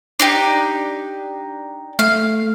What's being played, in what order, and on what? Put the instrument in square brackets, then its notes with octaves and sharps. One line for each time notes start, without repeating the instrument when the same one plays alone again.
[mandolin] D4 D#4 G4
[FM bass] A3 [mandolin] F5